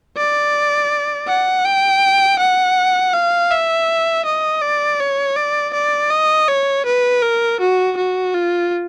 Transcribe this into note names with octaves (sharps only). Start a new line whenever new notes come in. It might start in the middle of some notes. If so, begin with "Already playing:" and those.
D5
F#5
G5
F#5
F5
E5
D#5
D5
C#5
D5
D5
D#5
C#5
B4
A#4
F#4
F#4
F4